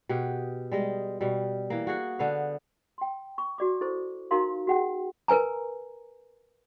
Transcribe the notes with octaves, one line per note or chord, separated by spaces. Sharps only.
B2 G4 G#4 F#5
G3 G#3 D#5
B2 G3
E3 A#3
F#4 G#4 F#5
D3 B3 C5 F5
G5 C6
C#6
F#4 D5 D6
E4 A4 C5 C#6
D#4 F#4 A#4 F5 A#5 C6
F#4 G#4 F#5 G5
A#4 B4 G#5 A#5